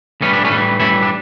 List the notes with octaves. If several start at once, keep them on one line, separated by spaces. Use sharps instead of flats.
A2 E3 G3 C#4
D4
A3 C#4
A2 E3 G3
A2 E3 G3 C#4 E4
D4